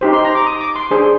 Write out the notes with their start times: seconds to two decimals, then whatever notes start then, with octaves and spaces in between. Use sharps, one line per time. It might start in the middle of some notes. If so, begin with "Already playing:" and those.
0.01 D#4 G4 C5
0.13 C6
0.25 A#5
0.35 D6
0.46 D#6
0.61 D6
0.76 C6
0.91 D4 G#4 C5